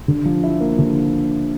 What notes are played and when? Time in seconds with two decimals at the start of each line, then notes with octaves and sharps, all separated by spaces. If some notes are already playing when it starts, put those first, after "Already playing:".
0.08 D3
0.26 F3
0.44 E4
0.61 A#3
0.78 D3